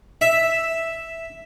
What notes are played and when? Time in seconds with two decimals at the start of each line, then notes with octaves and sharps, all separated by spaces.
0.21 E5